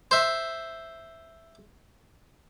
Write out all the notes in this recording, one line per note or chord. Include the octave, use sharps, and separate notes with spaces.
C5 E5